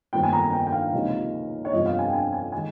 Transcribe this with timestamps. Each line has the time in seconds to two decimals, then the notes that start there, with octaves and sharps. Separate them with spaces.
0.13 G1 F2 D#3 A#3 G5
0.23 G#5
0.33 A#5
0.44 G#5
0.53 G5
0.67 G5
0.72 F5
0.93 C#2 C3 F3 A#3 D#4
1.65 C#5
1.73 G1 F2 C3 F3 C4 D#5
1.86 F5
1.99 G#5
2.09 G5
2.13 G#5
2.33 G#5
2.52 D#3 G#3 G#5